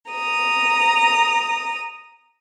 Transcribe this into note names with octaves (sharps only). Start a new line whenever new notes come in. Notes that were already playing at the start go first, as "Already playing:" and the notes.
A#5 D#6